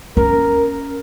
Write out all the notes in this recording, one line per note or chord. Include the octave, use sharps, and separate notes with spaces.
C#4 A#4